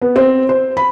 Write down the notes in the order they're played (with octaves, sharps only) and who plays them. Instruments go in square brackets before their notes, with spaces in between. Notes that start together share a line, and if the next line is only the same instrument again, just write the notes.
[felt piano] B3
C4
C5
B5